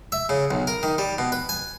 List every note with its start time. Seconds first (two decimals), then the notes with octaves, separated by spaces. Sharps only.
0.12 E5
0.29 C#3
0.51 B1
0.67 A#4
0.83 D#3
0.98 G3
1.18 B2
1.32 B4
1.49 G#5